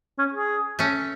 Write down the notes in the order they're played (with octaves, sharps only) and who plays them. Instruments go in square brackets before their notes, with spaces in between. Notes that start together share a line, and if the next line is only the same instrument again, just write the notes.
[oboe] C#4
G#4
[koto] A3 C#4